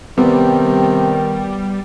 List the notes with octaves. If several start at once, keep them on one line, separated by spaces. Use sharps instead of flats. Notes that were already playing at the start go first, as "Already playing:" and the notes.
C3 D#3 G3 B3